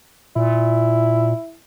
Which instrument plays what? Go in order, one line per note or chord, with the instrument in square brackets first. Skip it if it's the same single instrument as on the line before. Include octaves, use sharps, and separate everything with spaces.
[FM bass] A#2 [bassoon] E4